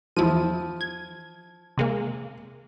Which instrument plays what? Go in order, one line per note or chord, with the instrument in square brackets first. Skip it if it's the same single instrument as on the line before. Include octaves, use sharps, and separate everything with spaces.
[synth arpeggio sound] E2 E4 D#7 [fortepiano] F3
[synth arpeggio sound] G#6
C3 G#3 A#3